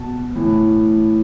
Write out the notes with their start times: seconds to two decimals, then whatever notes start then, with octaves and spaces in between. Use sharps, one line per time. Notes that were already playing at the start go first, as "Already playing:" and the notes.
Already playing: B2 A5
0.35 A2 E3